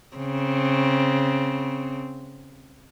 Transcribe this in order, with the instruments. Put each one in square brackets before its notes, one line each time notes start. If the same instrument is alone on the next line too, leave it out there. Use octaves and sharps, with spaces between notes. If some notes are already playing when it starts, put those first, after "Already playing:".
[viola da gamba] C#3 C4